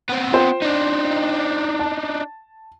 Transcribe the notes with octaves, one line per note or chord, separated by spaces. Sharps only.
B3 C4
F4 C5 G5
D4 D#4
A5